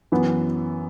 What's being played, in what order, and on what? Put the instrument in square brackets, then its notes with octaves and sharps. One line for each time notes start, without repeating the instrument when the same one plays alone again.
[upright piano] F#2 E3 B3